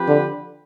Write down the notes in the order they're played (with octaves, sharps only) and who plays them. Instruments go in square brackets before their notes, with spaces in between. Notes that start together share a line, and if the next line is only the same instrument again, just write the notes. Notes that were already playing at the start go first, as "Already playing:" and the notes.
Already playing: [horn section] F3 C4 G4 B4
[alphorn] D3